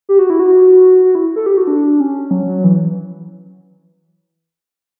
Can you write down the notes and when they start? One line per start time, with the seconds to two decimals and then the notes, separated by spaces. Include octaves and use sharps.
0.09 G4
0.19 F#4
0.30 E4
0.40 F#4
1.04 F#4
1.15 E4
1.36 A4
1.46 G4
1.57 F#4
1.67 D4
2.00 C#4
2.31 F#3
2.47 F#3
2.64 E3